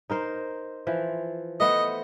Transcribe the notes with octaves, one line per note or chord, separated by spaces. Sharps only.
D#4 A#4 C5
E3 F3
A3 B3 C5 D#5